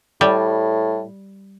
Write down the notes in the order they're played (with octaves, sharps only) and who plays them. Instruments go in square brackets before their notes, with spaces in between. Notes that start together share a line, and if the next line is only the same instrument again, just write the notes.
[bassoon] A2 [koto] G3